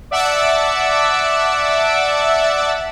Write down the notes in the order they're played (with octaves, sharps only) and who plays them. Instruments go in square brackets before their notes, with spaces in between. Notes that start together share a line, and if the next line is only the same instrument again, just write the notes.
[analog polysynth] D5 E5 F#5 A5 D6 E6